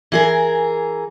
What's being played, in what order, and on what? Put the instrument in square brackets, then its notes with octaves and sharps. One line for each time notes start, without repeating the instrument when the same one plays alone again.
[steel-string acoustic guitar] E3 G#4 A#4